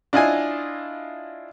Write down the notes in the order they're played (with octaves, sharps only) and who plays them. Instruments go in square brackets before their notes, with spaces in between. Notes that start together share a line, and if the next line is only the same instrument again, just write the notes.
[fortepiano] D4 E4 F4 D#5 F5 G#5